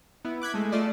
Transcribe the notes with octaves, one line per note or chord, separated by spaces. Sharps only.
B3 E4
D6 F#6 G#6 B6
G#3 A3
A3 F4 D5 D#5